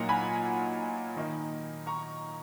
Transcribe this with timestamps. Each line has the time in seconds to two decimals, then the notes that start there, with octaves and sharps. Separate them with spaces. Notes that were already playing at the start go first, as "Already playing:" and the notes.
Already playing: A#2 F#3 A#3 D#4 F#5 A#5
0.09 G#5 B5
1.16 D#3 A#3 D#4
1.87 A#5 C#6